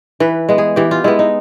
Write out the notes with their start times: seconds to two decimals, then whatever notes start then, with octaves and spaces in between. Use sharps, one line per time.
0.20 E3 B4
0.49 G#3 B3
0.58 G#4
0.76 E3 G4
0.91 F4
1.04 G#3 B3 E4
1.19 D#4